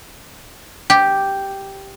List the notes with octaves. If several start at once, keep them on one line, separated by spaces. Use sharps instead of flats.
G4